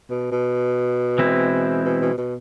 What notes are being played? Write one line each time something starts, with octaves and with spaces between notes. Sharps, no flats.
B2
B2
E3 G#3 C4 E4
B2
B2
B2